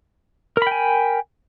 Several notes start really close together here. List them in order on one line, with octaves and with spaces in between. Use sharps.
A#4 B5 G5 G#5